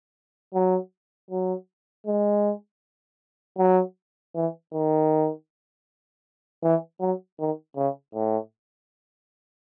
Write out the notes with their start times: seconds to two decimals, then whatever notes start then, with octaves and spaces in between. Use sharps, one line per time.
0.54 F#3
1.31 F#3
2.07 G#3
3.58 F#3
4.35 E3
4.73 D#3
6.63 E3
7.00 F#3
7.39 D#3
7.76 C#3
8.14 A2